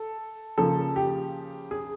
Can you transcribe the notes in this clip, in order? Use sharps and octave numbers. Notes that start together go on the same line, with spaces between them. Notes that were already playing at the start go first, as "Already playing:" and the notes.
Already playing: A4
C#3 F3 A#3 A4
G4
G#4